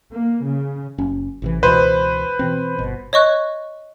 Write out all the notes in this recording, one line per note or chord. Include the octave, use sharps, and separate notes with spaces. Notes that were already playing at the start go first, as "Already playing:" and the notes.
A#3
C#3
F#1 C#4
A1 C3 E3
C#2 B2 E3 B4 C5
B2 E3 C4
G1 B2
C#5 D#5 C#6 F#6